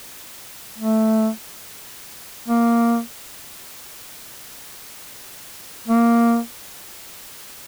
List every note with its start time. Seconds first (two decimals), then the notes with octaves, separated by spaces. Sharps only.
0.78 A3
2.48 A#3
5.88 A#3